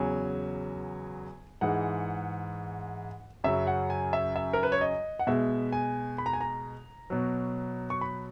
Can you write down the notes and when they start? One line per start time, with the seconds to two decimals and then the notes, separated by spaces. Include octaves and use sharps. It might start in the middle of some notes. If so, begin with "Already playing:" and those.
Already playing: E2 C#3 F#3 G#5
1.61 G#2 E3 G#3 F#5
3.44 F#2 C#3 F#3 E5
3.67 F#5
3.90 G#5
4.13 E5
4.36 E5
4.53 A#4
4.63 B4
4.72 C#5
4.81 D#5
5.19 F#5
5.27 B2 G#3 E5
5.72 G#5
6.18 B5
6.26 A#5
6.33 G#5
6.41 A#5
7.10 B2 F#3
7.90 C#6
8.01 B5